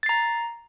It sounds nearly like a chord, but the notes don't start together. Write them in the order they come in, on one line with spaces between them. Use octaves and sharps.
A6 C7 A#5